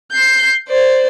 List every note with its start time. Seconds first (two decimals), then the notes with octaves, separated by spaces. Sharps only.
0.12 G6 C7
0.69 C5 D5